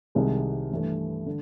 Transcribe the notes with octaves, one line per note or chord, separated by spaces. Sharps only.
C2 C3 D#3 G#3
G2 E3 A3
D3